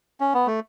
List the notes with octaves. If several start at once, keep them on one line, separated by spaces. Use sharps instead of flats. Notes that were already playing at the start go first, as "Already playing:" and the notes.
C#4
B3
A3